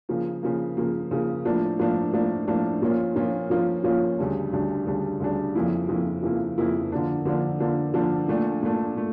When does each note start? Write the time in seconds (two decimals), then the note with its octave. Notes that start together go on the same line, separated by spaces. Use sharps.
0.09 C#3 F3 A#3
0.43 C#3 F3 A#3
0.77 C#3 F3 A#3
1.11 C#3 F3 A#3
1.45 A2 F3 A#3 D4
1.79 A2 F3 A#3 D4
2.13 A2 F3 A#3 D4
2.48 A2 F3 A#3 D4
2.82 A#2 F3 A#3 C#4 F4
3.16 A#2 F3 A#3 C#4 F4
3.50 A#2 F3 A#3 C#4 F4
3.84 A#2 F3 A#3 C#4 F4
4.18 D2 C#3 G3 D4
4.53 D2 C#3 G3 D4
4.86 D2 C#3 G3 D4
5.20 D2 C#3 G3 D4
5.55 F2 C#3 F3 A#3 E4
5.89 F2 C#3 F3 A#3 E4
6.23 F2 C#3 F3 A#3 E4
6.58 F2 C#3 F3 A#3 E4
6.92 D3 F3 A#3 D4
7.25 D3 F3 A#3 D4
7.60 D3 F3 A#3 D4
7.94 D3 F3 A#3 D4
8.28 A#2 A3 D4
8.63 A#2 A3 D4
8.96 A#2 A3